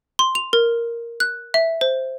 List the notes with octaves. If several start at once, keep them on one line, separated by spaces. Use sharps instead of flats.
C6
F7
A#4
F#6
E5
C5